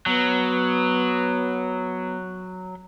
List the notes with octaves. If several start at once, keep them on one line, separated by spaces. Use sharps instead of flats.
F#3 B3